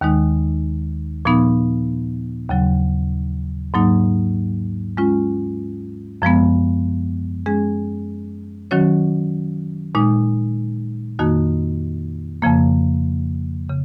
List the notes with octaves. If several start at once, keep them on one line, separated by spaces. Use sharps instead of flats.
D#2 D#3 G#3 D#4
A#2 F3 B3 D#4
D#2 C#3 F#3
G#2 F#3 A#3 D#4
G#3 C#4 F4
F#2 F3 G#3 B3
G#3 C#4 G#4
D#3 F#3 C#4 F#4 C#5
A#2 G#3 D#4
F2 D#3 A#3 D#4 F#4
F2 C#3 F3 A#3
C#3